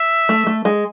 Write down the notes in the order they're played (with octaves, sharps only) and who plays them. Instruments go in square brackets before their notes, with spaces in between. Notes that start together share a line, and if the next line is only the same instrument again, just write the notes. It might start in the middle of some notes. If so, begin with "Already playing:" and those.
Already playing: [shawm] E5
[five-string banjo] A3
A3
G#3